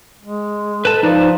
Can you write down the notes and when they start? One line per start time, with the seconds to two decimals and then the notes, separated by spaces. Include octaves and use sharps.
0.22 G#3
0.85 A4 B4 A5
1.03 F3 D#4 B4 D5